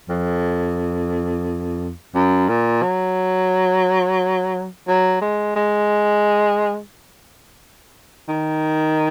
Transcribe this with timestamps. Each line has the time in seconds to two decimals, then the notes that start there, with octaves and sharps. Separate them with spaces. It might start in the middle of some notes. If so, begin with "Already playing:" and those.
0.09 F2
2.15 F#2
2.48 A#2
2.83 F#3
4.88 F#3
5.22 G#3
5.56 G#3
8.29 D#3